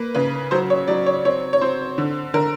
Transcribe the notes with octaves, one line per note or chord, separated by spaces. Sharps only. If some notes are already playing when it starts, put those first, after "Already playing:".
Already playing: A#3 B4
C#3 B4
F#3 C5
C#5
F#3 D5
C#5
C4 C#5
C#5
C4 C5
D3
D3 A#4